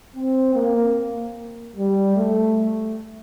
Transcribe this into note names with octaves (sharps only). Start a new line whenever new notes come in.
C4
A#3
G3
A3